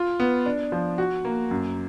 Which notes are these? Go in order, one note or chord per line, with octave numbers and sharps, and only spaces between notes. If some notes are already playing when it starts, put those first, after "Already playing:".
Already playing: F4
B3
D4
F3
F#4
A#3
F#2